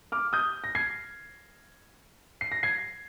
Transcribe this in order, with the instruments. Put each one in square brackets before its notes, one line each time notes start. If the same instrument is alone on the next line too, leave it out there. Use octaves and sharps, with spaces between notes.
[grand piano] D6 F6
D#6 G6
A#6
G#6 C7
C7
A#6
G#6 C7